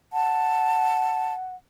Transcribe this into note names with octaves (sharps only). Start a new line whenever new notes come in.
F#5 A5